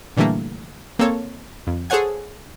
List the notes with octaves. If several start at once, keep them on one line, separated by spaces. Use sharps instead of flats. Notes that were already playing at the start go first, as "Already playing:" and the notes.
A#2 D3 E3 G3 A3 A#3
A#3 C4 A4 C#5
F2
G#4 A4 C5 C#5 F#5 G#5